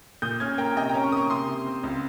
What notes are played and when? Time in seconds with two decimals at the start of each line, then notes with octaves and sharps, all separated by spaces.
0.22 A#2 D#6 G6
0.40 C#4 F6 G#6
0.58 A#3 G5 A#5
0.76 C3 D#5 G5
0.89 G5 A#5
0.94 C#4
1.03 A#5 C#6
1.12 A#3 D#6
1.16 A#5 C#6
1.30 C3 C6 D#6
1.47 C3
1.66 C4
1.84 C#2